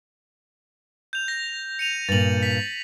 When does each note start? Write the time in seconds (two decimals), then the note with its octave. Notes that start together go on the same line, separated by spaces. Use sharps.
1.13 G6 F7
1.28 A#6
1.79 C#7 D#7 F7
2.08 G2 A#2 A6 F#7
2.43 B6